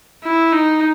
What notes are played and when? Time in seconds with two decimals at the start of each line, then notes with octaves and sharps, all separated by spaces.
0.24 E4
0.52 D#4